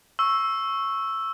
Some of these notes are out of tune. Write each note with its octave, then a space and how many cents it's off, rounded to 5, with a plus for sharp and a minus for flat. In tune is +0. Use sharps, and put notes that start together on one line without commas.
C#6 -10 E6 +0